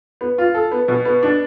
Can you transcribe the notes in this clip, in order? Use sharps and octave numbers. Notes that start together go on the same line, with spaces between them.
B3
F4
A4
B3
B2
B3
D4